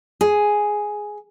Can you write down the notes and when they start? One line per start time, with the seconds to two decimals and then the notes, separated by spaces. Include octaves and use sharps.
0.21 G#4